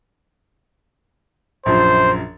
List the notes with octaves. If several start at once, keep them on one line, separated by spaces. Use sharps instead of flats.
A#1 F#2 F3 C5